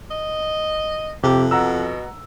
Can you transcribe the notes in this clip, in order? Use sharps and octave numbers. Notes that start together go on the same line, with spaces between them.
D#5
F2 C3 G4
B2 F#5 A#5 E6